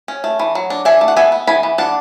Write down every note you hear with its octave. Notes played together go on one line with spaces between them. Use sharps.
C#4
A3
E3
F#3
D4
D4 E5 G#5
A3
F#5
B3 E5 G#5
B3
E3 G#5 B5
E3
D4 F#5 A5